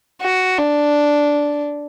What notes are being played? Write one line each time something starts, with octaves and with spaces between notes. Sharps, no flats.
F#4
D4